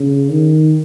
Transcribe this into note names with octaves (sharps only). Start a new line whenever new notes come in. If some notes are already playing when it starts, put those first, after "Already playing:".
Already playing: C#3
D#3